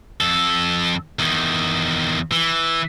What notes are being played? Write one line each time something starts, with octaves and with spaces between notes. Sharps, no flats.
F2 A4
E2 D#3
E3